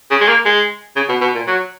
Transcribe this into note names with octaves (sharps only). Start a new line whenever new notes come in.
C#3
G#3
A#3
G#3
C#3
B2
B2
A#2
F#3